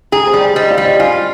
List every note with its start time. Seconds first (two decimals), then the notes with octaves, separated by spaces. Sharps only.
0.12 G#4 G5 A#5
0.27 C5
0.33 G3
0.41 D5
0.56 G3 C5 D#5
0.70 D5 F5
0.78 G3
0.85 C5 D#5
0.99 F4 F5 G#5